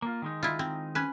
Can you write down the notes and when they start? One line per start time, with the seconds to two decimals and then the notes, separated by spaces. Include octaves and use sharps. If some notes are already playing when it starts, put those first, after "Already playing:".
0.02 A#3 F4
0.22 D#3 G#3 D#4
0.43 E4 F4
0.59 C4
0.95 C#4 B4